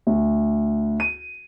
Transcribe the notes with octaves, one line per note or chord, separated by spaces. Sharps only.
D2
D#7